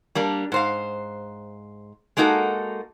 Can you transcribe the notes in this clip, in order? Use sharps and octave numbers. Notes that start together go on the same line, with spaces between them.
G3 A#3 D4
G#2 C5 F5
G#3 A#3 D#4 F#4 A4